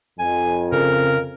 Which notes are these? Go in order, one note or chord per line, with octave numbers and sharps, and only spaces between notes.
F2 G#5
C#3 A#4